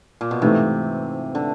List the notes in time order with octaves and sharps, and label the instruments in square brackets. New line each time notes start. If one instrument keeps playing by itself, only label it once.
[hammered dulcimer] A#2
B2
[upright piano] G#2 E3 A3 [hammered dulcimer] C3
[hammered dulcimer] D3